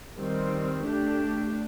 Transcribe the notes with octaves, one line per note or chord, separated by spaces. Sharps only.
D#3 G3 C4
A3 D4 G4